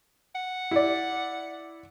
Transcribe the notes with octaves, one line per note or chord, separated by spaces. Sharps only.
F#5
E4 D5